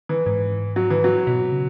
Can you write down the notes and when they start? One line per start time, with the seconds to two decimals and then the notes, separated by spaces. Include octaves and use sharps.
0.09 E3
0.26 G#2
0.76 F#3
0.90 E3
1.04 F#3
1.27 B2
1.52 C#3